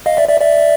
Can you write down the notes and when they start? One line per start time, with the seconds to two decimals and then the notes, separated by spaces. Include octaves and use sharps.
0.06 D#5 F5
0.17 D5 E5
0.29 D5 E5
0.41 D5 E5